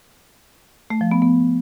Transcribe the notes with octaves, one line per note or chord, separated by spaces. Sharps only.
A3
F3
B3
B3